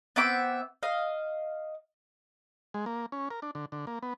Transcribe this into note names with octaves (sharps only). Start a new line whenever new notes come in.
B3 C4 E5 D6
D#5 F5
G#3
A#3
C#4
A#4
D4
D3
D3
A#3
B3